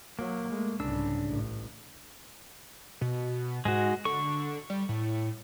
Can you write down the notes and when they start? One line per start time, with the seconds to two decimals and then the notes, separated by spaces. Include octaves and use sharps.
0.19 F#3 A#3
0.50 G#3 A3
0.80 C2 G#2 C#3 D4 E6
1.27 A1
3.01 B2
3.65 G#2 G#3 F#4
4.05 D3 C#6
4.70 G3
4.89 A2